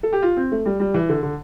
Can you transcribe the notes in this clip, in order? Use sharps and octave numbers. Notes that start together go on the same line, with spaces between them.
A4
G4
F4
C4
A3
G3
G3
E3
D3
D3